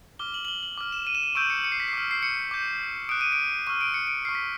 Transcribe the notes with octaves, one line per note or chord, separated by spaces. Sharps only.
D6 F6 G7
F#7
F#7
G7
F#7
D6 F6
E7
D#7
E7
D#7
C#6 E6 G6 D7
C#7
C#7
C7
B6
C7
D6 F6
C7
C#7
D6 G6
D#6 F#6 D7
D#7
D7
C#6 F6 D#7
D7
C#7
D7
C#6 F6 C7
B6